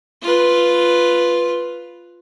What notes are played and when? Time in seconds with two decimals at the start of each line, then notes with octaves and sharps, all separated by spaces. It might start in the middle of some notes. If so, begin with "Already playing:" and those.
0.22 F4 B4